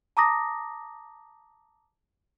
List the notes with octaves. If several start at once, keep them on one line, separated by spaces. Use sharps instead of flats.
A5 A#5 D6 D#6 A#6